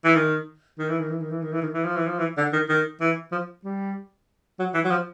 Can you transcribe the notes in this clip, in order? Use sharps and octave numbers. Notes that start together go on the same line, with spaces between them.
E3
D#3
D#3
E3
D#3
E3
D#3
E3
D#3
E3
D#3
E3
F3
E3
F3
E3
D3
D#3
D#3
E3
F3
G3
F#3
E3
F#3
F3